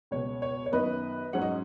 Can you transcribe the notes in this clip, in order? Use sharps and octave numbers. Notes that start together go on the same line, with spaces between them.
C#2 B2 G#3 C#5
C#5
C#5
F#2 D#3 B3 B4 D#5
G#2 F#3 C#4 F#5
D#5